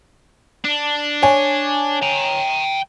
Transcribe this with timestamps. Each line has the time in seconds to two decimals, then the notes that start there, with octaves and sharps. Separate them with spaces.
0.64 D4
1.22 C#5 G#5
2.02 G5 A#5